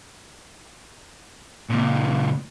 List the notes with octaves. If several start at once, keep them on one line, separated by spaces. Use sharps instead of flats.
C#2 A#2